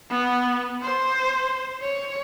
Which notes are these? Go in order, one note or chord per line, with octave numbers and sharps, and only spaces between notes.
B3
C5
C#5